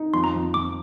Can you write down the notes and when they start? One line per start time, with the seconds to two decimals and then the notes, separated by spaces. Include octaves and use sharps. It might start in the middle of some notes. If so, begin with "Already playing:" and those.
Already playing: D#4
0.14 F2 C6
0.24 A#5
0.34 F2
0.54 F2 D6